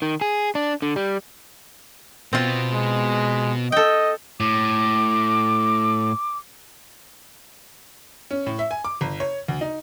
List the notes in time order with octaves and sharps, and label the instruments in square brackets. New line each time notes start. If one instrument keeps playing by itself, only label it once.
[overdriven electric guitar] D#3
G#4
D4
D3
G3
[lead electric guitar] B2 B3 [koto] C4 F4
[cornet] G#3
[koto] A4 G5 [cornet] D#5
[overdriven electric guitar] A2 [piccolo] D6
[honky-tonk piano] C#4
A2
E5
G#5
D6
G1
C#5
D2
D#4